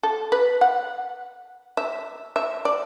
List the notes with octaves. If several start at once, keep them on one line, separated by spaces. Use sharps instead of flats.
A4
B4
F#5
E5
E5
D5